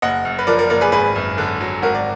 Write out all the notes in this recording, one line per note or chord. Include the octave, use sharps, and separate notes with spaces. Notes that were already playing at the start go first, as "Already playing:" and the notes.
F#1 D#5 F#5
F#2
B4
F3 A#4 D5
A#4 D5
F#1 A#4 D5
G#4 B4
G#1 G#4 B4
F#2
D3
F#3
G#1 F#4 A#4
D5